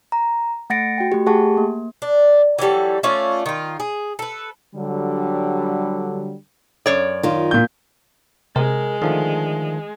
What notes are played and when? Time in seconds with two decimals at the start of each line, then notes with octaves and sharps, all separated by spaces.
0.12 A#5
0.70 A3 F#5 A6 A#6 C#7 D7
0.98 F#4 G5
1.12 A3 G4
1.26 A3 G4 G#4 F#5 A5 C#6
1.57 A#3
2.02 D4
2.59 E3 F#3 G3 A4
3.03 A3 C#4 F4 D5
3.46 D#3 F4
3.80 G#4
4.19 A4 B4
4.75 D3 F#3 G3
6.86 F#2 C#5 D5
7.23 D#3 F4
7.51 A#2 G6
8.56 C3 G#3 A#4
9.02 D3 D#3 F3 A3